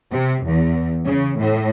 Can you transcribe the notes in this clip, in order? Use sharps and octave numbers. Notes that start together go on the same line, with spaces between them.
C3
E2
C#3
A2